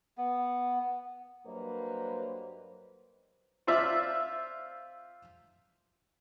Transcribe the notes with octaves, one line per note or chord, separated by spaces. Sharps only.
B3
G2 F#3 A#3 B4 C5 D#5
C4 F4 D5 E5